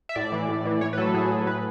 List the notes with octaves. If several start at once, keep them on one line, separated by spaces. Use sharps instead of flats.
E5
A2 D5
E3
A2
E3
A2 C#5
B4
F#3 A4
A2 G#4
F#3
A2 B4